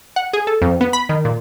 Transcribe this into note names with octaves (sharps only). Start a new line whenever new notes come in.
F#5
G#4
A4
F2
B3
B5
D#3
A#2